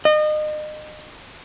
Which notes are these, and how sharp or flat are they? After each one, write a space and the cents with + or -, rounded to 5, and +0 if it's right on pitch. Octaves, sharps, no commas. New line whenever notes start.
D#5 -30